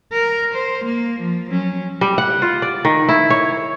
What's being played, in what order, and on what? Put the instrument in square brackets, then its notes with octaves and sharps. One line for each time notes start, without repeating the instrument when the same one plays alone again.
[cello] A#4
C5
A#3
F3
F#3 C#4
[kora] G3
F#5
F4
D5
D#3
E4
C#5